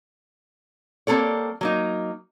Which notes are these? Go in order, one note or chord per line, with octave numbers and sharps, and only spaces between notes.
G3 A#3 C4 A4 C#5
F#3 A#3 D#4